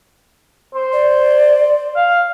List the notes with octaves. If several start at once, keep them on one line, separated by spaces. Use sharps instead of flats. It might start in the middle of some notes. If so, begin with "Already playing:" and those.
C5
D5
F5